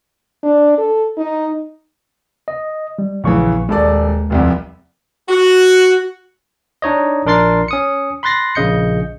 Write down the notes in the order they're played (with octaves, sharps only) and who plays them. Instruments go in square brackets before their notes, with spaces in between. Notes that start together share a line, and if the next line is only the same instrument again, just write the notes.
[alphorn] D4
A4
D#4
[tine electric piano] D#5
G3
[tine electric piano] A#1 C#6 [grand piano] E2 C#3 E3
[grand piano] D#1 A4 D5 [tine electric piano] G#3
[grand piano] F1 C2 F2
[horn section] F#4
[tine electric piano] D4 D#4 C#5 D#5
A#1 D4 A#4 C6 A6 C7
C#4 D#6 C#7
B5 C6 F#6 A6 A#6 C7
A#1 C#3 D#5 G6 C#7